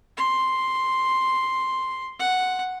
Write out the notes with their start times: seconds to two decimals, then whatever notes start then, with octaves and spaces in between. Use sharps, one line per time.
0.17 C6
2.19 F#5